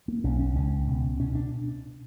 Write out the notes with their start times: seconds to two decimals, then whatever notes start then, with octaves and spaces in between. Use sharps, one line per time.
0.08 A#3
0.24 B1 C#4
0.39 C#4
0.56 C#2 C#4
0.87 B2
1.19 B2 C#4
1.35 D4